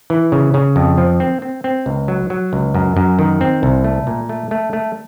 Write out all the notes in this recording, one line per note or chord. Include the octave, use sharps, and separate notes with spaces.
E3
C#3
C#3
F2
F3
C4
C4
C4
C#2
F#3
F#3
C#2
F#2
F#2
D#3
C4
C2
A3
A#2
A3
A3
A3